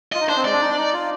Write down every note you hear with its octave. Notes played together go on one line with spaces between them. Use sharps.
F4 D#5
D#4
D4 C5
C4
G#3 D5
D4
D#4
D4
D#4
F4